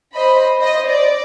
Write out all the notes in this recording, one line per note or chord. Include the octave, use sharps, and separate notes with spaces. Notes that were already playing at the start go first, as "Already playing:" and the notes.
C5 D#5 B5
C5 D#5
D5